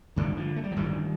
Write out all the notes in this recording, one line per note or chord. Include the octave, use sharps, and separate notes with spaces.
A1 G2 D3 D#3 G3
D3 F3
A3
G3
F3
A1 G2 D3 D#3 G3